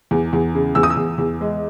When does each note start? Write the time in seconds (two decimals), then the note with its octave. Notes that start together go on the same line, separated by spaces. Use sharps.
0.11 E2
0.33 E2
0.55 C#3
0.75 E2 E6
0.83 D#6
0.90 E6
0.97 E2
1.18 E2
1.41 G#3